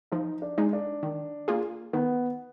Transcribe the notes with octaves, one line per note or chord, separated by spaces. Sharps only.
F3 D#4
D4
G#3 D#4
D4
D#3
A#3 F4 G#4
D#3 B3